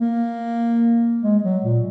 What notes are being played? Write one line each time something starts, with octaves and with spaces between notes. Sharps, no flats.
A#3
G#3
F#3
A#2